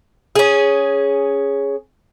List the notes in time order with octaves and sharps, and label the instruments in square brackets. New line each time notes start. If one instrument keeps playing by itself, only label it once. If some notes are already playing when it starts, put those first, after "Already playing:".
[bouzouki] C#4 G#4